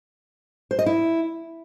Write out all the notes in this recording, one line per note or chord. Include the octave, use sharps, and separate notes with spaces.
C5
D#5
E4